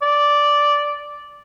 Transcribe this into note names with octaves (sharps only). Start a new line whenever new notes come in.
D5